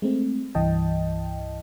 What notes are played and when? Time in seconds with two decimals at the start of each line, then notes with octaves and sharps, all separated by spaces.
0.02 G#3 A3 C4
0.55 C2 G2 E3 D#5 G5 A5